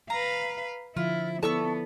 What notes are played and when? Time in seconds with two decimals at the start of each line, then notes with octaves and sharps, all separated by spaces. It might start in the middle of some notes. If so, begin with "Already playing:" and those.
0.10 B4 F5 A#5
0.97 D3 F3 E4 F4
1.43 B3 E4 A4 D5 A5 C#6 E6